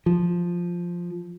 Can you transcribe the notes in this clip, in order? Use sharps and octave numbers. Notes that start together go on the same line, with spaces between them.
F3